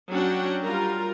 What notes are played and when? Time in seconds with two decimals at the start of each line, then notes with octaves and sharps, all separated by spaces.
0.11 F#3 C#4 D4 F#4 F#5 G5
0.65 G3 F4 A#4 A#5